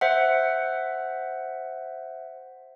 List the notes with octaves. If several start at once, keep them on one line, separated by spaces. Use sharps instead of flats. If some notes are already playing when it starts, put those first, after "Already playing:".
C5 E5 F#5